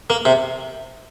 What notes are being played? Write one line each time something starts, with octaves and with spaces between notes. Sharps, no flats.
A#3
C3